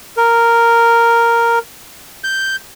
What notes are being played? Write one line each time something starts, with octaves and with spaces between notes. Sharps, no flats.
A#4
G6